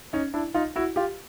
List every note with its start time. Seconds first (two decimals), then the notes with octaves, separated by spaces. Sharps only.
0.13 C#4 D#4
0.34 D4 E4
0.54 D#4 F4
0.76 E4 F#4
0.96 F4 G4